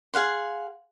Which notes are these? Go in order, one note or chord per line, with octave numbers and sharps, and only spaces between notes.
G#4 F5 F#5 C6